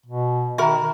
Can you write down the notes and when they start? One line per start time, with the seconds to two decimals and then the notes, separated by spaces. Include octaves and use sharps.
0.06 B2
0.58 D#3 F#4 A#4 E5 A#5 B5